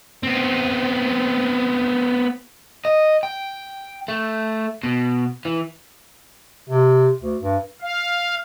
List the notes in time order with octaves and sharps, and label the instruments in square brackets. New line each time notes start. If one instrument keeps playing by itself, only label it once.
[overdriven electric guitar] B3 C4
D#5
G5
A3
B2
E3
[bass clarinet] C3
D2
G2
[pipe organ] F5